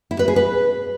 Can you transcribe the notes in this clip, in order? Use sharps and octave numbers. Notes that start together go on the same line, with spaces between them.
E4
B4
G#4
B4